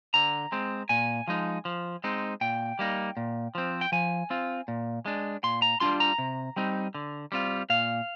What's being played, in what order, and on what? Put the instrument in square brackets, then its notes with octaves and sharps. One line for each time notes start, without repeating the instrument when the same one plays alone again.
[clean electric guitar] D3 A#5
G#3 C4
A#2 G#5
F3 G#3 D#4
F3
G#3 C4 D#4
A#2 G5
G3 A#3 D#4
A#2
F3 C4
G5
F3 G#5
C4 F4
A#2
G#3 D4
A#2 C6
A#5
G3 D4 F4 C6
A#5
C3
G3 C4 D#4
D3
G3 C4 F4
A#2 F5